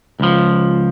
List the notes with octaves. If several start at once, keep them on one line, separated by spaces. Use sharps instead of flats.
C#2 F3